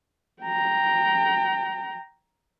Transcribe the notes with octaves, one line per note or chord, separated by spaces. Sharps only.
G5 A#5